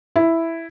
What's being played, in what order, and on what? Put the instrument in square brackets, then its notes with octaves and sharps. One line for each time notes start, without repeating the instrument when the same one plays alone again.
[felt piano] E4